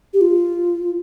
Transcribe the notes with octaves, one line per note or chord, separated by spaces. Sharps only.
G4
F4